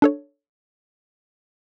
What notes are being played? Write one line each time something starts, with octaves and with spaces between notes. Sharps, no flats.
D4 A4 C#5